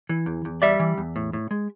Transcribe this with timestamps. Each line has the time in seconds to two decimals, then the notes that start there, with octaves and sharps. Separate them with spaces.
0.09 E3
0.26 E2
0.45 E2
0.62 G3 D5 E5
0.80 E3
0.98 E2
1.16 A2
1.33 A2
1.51 G#3